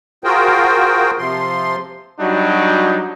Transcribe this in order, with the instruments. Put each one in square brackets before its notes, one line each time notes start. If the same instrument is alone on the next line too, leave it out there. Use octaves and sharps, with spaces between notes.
[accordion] F4 F#4 G#4 A#4 C5 G5
C3 F3 C6
[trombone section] F#3 G3 D4 D#4 F#4